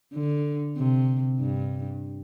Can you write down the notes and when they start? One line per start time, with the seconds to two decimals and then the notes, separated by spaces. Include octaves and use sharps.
0.13 D3
0.77 C3
1.40 G2